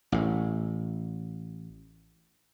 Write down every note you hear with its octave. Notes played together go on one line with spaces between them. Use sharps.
A1 A2